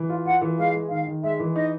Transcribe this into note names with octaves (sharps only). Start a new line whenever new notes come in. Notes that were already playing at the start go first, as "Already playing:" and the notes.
Already playing: E3
F4
F4 F#5
E3
G#3 F5
G#3
D#3 F5
D#3
G#3 E5
E3
D#4 D#5